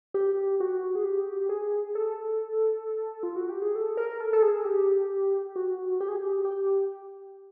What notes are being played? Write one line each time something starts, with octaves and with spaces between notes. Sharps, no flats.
G4
F#4
G#4
G4
G#4
A4
F4
F#4
G4
G#4
A4
A#4
A4
A4
G#4
G4
F#4
G4
G#4
G4
G4